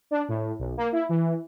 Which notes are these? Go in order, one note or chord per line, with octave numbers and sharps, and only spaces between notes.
D4
A2
B1
A#3
E4
E3